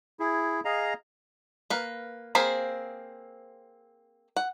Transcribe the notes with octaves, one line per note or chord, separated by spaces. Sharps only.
E4 G#4
G#4 D#5 F5 A#5
A#3 B4
A#3 C4 G#4 C5 B5
F#5